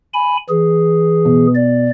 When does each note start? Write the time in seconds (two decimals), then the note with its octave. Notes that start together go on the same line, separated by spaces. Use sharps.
0.13 G#5 B5
0.49 E3 G#4
1.25 B2
1.55 D5